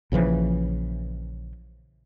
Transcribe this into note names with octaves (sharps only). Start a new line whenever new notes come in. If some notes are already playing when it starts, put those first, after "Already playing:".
A#1 C#3 E3 F3